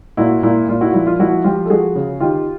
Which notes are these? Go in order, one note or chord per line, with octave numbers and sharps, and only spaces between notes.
A#2 E4 F#4
A#2 E4
A#2 F4
E4 F#4
F3 E4
F4
F3 E4 F#4
F3 F4 G4
A4
F3 F#4 G#4
C#3
D#3 F4 G4